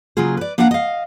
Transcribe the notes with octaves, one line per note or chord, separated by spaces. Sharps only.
C#3 F#3 A#3 F4 G#4
B4 D5
A#3 D4 B4 F5 F#5 A#5
D#5 F5